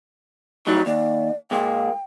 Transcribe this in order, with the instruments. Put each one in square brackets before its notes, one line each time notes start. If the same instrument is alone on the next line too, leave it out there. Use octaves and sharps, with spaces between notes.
[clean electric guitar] A2 F#3 G3 [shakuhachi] D#4
[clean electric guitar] D#2 [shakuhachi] D5
[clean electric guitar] A#2 G#3 A#3 [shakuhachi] G5